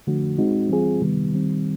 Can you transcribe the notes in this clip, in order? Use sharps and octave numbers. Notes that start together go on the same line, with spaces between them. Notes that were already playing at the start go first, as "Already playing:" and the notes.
D3 F3 A3 D4 F#4
G#3 C4 D#4 F#4
E3 G3 C4 F4 G#4
C3 D#3 G3 B3
D#3 G3 C4